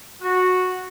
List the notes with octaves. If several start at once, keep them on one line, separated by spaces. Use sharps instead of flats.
F#4